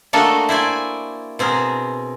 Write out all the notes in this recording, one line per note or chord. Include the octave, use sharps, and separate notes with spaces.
A3 A#3 D4 F#4 A4 D#5
E4 C5 D5 G#5
B2 C4 G#4 A#4